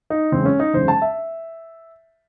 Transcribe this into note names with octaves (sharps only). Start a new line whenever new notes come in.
D#4
F#1 E2 C#3 G#3 C4
C#4
D#4
F#1 E2 C#3 G#3 C5
A5
E5